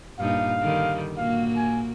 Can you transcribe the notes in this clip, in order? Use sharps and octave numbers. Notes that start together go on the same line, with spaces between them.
G2 A#2 D#4 F5
D3 D#3 G3
A#2 A#3 F#4 F5
G#5